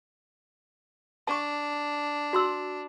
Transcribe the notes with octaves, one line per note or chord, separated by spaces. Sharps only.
D4 A5 C#6
F#4 C6 E6